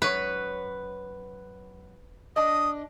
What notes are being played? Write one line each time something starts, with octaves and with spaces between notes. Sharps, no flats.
F#2 B4 C#5
D4 D#5 D#6